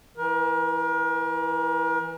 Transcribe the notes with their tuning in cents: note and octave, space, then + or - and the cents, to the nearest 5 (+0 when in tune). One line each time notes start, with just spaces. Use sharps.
E3 +0 A#4 +35